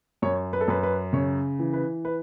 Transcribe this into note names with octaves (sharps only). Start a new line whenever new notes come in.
F#2 C#5
B4
A4
F#2 B4
B4
C#3 C#5
E3
B4
B4